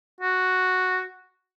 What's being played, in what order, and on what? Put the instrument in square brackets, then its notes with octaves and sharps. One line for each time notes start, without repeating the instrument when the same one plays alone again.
[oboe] F#4